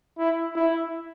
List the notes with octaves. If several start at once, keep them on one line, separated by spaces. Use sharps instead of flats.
E4
E4